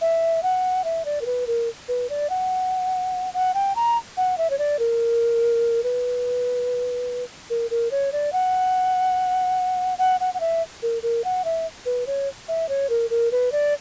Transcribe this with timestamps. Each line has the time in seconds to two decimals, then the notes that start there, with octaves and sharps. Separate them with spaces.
0.01 E5
0.43 F#5
0.84 E5
1.05 D5
1.21 A#4
1.26 B4
1.47 A#4
1.88 B4
2.10 D5
2.30 F#5
3.34 F#5
3.54 G5
3.76 A#5
4.17 F#5
4.38 E5
4.50 C#5
4.59 D5
4.79 A#4
5.83 B4
7.50 A#4
7.71 A#4
7.91 C#5
8.12 D5
8.33 F#5
9.98 F#5
10.20 F#5
10.34 F#5
10.40 E5
10.82 A#4
11.03 A#4
11.24 F#5
11.45 E5
11.86 B4
12.07 C#5
12.48 E5
12.69 C#5
12.90 A#4
13.10 A#4
13.31 B4
13.52 D5